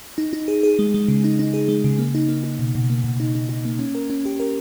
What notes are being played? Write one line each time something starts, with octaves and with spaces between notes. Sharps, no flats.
D#4
D#4
G#4
G#4
G#3
G#3
C#3
D#4
D#4
G#4
G#3
C#3
A#3
D#4
A#3
D#4
B2
B2
A#3
B2
D#4
D#4
D#4
A#3
C#4
A#4
C#4
G4
A#4